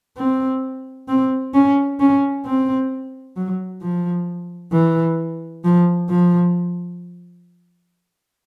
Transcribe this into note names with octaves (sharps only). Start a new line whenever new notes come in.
C4
C4
C#4
C#4
C4
F#3
F3
E3
F3
F3